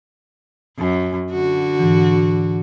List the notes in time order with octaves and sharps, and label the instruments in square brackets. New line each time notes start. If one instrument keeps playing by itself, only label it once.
[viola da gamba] F#2
D3 F#4
[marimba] G#2 E3